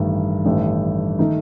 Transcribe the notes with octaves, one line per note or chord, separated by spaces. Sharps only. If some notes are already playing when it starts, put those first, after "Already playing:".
Already playing: A1 G2 D#3 A3
A1 G2 D#3 A3
D#3 A3 D#4